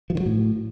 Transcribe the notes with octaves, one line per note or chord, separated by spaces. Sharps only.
F3
D#3
F#3
A2